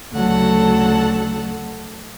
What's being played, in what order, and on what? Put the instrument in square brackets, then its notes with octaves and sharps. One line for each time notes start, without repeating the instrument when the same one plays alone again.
[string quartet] D2 C#3 F#3 A4 F#5 A5